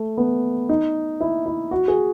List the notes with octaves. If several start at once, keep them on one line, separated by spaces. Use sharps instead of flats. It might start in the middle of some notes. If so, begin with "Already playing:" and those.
Already playing: A3
B3
D#4
E4
E4
F#4
G#4